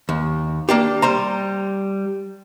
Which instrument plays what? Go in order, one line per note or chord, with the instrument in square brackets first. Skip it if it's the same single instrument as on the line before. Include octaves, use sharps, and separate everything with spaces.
[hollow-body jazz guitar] D#2
A#3 D4 G4
G3 C5 A#5